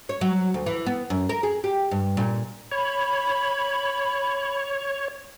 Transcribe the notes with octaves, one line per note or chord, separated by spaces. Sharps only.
C#5
F#3
D2
E3
B3
F#2
A#4
G#4
G4
G2
A#2
C#5 B5